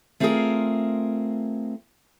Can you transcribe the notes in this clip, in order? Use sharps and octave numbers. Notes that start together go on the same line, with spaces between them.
A3 C4 F4 F#4 G#4 A#4